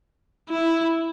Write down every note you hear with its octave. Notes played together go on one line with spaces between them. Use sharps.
E4